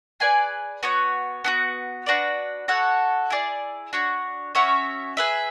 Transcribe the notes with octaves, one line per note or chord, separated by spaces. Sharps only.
G#4 B4 D5 G#5
B3 F#4 C#5
B3 D4 F#4
D4 F#4 B4 D5
F#4 A4 C#5 F#5
E4 G#4 D5
D4 F#4 C#5
C#4 F#4 C#5 E5
G#4 B4 E5